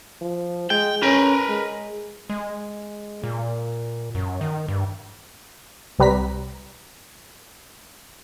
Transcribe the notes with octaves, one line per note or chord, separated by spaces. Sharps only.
F3
G#3 G5
C#4 A#4 B4
G#3
G#3
A#2
F#2
D#3
G2
C2 C3 G3 B4 A#5 B6